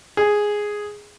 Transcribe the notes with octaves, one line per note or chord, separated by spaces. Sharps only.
G#4